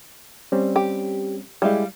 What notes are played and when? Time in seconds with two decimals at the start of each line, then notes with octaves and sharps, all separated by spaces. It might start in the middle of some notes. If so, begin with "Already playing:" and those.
0.52 G3 C4 C#4
0.76 G4
1.62 G3 G#3 E4 G4 F5